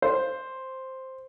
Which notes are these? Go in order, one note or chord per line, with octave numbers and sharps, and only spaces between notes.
C5